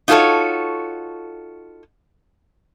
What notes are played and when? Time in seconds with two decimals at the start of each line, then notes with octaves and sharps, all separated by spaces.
0.08 D#4 F4 F#4 G#4 A4 C#5